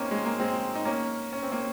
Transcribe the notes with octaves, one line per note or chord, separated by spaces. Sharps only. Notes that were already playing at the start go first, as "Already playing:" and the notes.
Already playing: A#3 C4 C#4 D#4
G#3
A#3
G#3 C4
D#4
A#3 C#4
C#4
C4
A#3 C#4